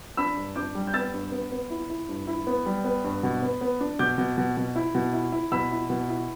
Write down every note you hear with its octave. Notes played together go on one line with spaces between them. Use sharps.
D4 B5 E6
G2
D4 D6 G6
G3
G6
B3 E6 A6
G2
B3
B3
E4
E4
G2
E4
B3
G3
B3
G2
B2
B3
B3
D4
B2 D6 G6
B2
B2
B2
E4
B2
E4
E4
B2 B5 E6
E4
B2
E4